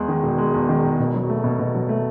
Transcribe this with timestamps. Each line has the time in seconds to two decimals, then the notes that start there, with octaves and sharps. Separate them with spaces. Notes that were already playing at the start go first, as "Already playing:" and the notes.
Already playing: E2 G#3
0.08 D#3
0.23 E1
0.38 G#3
0.53 E2
0.69 D#3
0.83 E1
0.99 B2
1.14 F#3
1.29 A3
1.44 B2
1.59 B2
1.74 F#3
1.89 A3